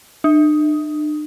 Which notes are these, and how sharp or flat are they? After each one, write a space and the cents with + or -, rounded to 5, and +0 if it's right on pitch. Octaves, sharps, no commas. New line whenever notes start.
D4 +45